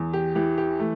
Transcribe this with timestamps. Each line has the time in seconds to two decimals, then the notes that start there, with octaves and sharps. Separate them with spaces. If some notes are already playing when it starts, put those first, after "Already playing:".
Already playing: E2
0.13 G4
0.35 E3 G4
0.58 G4
0.80 A3